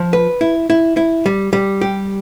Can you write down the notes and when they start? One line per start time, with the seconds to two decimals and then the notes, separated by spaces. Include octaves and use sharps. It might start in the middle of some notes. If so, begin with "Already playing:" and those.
Already playing: F3
0.13 B4
0.41 E4
0.70 E4
0.97 E4
1.26 G3
1.53 G3
1.81 G4